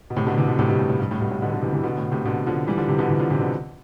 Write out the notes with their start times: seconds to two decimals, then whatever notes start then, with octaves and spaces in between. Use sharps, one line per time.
0.10 B2
0.16 A2 C3
0.27 B2 D3
0.37 C3 E3
0.48 B2 D3
0.59 A2 C3
0.68 G2 B2
0.79 A2
0.89 A2
1.00 G2
1.11 A2
1.21 G2 B2
1.31 A2
1.42 B2 D3
1.52 B2 D3
1.62 C3 E3
1.73 C3 E3
1.83 B2 D3
1.98 A2
2.11 A2 C3
2.25 B2 D3
2.46 D3 F3
2.67 E3 G3
2.77 D3 F3
2.88 C3 E3
2.98 B2 D3
3.09 C3 E3
3.19 D3 F3
3.30 C3 E3
3.40 B2 D3